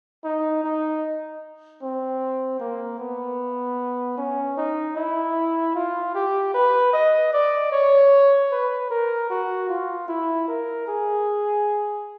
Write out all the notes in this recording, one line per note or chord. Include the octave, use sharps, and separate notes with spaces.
D#4
D#4
C4
A#3
B3
C#4
D#4
E4
F4
G4
B4
D#5
D5
C#5
B4
A#4
F#4
F4
E4
A#4
G#4